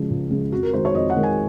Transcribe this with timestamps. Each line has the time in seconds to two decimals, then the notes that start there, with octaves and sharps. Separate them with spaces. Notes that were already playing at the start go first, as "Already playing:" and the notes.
Already playing: C#3 F3 G#3
0.10 C#2
0.30 C#3 F3 G#3
0.52 F2 F#4
0.63 A#4
0.73 D#3 G#3 C5
0.85 C#5
0.94 F2 D#5
1.10 F#5
1.16 D#3 G#3
1.23 G#5